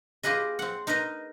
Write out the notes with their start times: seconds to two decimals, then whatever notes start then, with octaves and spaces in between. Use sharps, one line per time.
0.23 F4 G4 G#4 B4 D#5
0.59 C4 F#5
0.87 D#4 A#4 B4 D#5